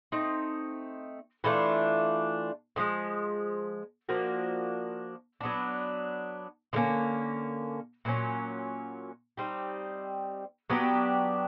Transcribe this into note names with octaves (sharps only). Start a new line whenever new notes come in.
A3 C4 D#4
E3 A3 D4 F4
D3 F3 G#3
F3 A#3 D4 F#4
F#3 B3 D4
D3 G3 A#3 C#4
A#2 F#3 A#3 C#4
G3 C4 D#4 G4
F#3 B3 D4 G4